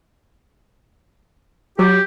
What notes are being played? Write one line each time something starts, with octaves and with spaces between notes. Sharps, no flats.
F#3 G4